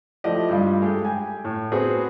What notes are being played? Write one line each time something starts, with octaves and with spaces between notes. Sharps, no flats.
F3 A3 E4 G4 D5 D#5
G2 G3 F4
G#3 G4 A4
G5 G#5
A2
B3 C4 F#4 G#4 B4